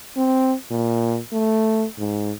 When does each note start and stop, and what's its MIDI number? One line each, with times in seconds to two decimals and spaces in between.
0.16 0.54 60
0.71 1.19 46
1.33 1.86 57
1.98 2.32 44